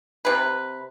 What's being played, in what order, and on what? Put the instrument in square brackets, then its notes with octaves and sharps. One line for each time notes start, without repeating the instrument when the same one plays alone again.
[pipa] C3 B4